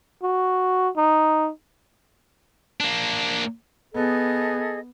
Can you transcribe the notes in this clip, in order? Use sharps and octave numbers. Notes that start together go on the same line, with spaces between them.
F#4
D#4
A#3 D4
B3 G#4 A4 D#5